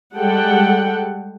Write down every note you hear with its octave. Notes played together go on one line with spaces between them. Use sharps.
G3 G#3 A4 F#5 G5